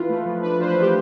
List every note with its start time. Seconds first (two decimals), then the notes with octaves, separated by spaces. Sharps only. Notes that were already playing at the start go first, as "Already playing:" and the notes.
Already playing: E3 F4 B4
0.09 A3
0.26 F3
0.43 D4 B4
0.59 F4 C5
0.67 B4
0.77 A3 G4